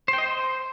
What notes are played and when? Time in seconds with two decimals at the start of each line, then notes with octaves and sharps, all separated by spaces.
0.08 C5
0.13 G5
0.18 D#5
0.23 C5